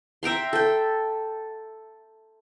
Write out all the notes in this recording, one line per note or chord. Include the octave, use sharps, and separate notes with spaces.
E5 G5 A#5 C6
A4 G5